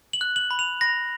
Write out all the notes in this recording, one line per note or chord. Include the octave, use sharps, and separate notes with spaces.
F#7
F#6
F#7
B5
F7
B5 A#6